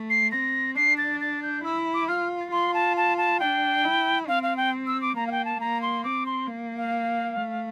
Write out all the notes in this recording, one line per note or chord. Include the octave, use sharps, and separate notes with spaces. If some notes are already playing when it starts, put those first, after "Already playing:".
Already playing: A3
C7
C4 A#6
D4 C7
A6
A6
G6
E4 E6
D6
F4 F6
F4 C6
A5
A5
A5
D4 G5
E4
C4 F5
F5
G5
E6
D6
A#3 A#5
F5
G5
A5
A#3 A#5
C6
C4 D6
C6
A#3
F5
A3